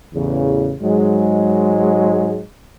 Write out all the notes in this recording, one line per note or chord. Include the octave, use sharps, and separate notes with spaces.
A1 E2 C#3
G#2 F#3 G#3